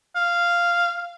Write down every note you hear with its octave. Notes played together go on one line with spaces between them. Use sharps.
F5